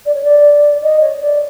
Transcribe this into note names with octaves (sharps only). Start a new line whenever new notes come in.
D5
C#5
D5
D#5
C#5
D5